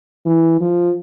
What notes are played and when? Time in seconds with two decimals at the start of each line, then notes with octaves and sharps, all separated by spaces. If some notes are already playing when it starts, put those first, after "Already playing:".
0.26 E3
0.61 F3